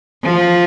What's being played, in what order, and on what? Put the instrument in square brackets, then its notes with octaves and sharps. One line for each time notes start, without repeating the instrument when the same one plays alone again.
[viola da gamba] F3